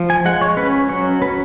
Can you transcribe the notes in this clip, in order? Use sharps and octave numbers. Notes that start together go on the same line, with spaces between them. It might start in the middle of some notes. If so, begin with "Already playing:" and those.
Already playing: F3
G#5
G#3 F#5
C#5
C#4 B4
F#3 C#5
C#4 B4